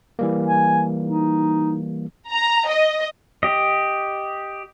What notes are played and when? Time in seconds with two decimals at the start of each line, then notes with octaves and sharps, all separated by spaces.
0.19 E3 G3 A#3
0.46 G#5
1.05 D#4
2.32 A#5
2.69 D#5
3.43 G4 D#5